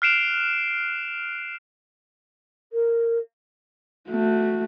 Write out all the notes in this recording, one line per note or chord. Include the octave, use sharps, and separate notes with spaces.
F6 F#6 C7 D7 E7 F7
A#4
A3 F#4